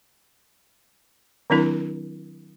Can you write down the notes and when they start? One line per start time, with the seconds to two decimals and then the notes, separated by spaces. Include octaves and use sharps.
1.50 D#3 F#3 C4 D4 E4 A#4